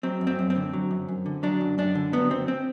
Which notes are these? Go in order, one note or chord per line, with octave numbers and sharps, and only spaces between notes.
F#3 C4
F#2
C4
F#2
C4
D3
F#3
F#2
F#2
D3
F#3 D4
F#2
F#2 D4
D3
F#3 B3
F#2 C4
C4